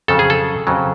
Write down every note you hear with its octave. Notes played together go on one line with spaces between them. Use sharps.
F2 C#3 F#3 A4
G#4
A4
F2 C#3 F#3